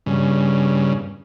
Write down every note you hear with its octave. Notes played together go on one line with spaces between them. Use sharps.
G2 C#3